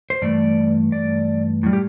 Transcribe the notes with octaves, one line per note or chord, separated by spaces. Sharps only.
C5
G2 E3 A3 D5
D5
A2 G3
G4